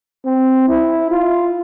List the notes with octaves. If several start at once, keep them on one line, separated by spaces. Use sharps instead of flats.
C4
E4
F4